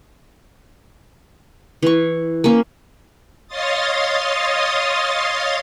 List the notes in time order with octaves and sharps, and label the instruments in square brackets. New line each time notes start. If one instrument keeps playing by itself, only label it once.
[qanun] E3 C#6
A#3 C#4
[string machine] C#5 D#5 F5 C6 D#6 A6